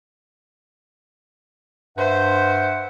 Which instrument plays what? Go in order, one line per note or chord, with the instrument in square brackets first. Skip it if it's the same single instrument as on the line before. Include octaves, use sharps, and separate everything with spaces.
[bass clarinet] G2 [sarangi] C5 [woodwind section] E5 F#5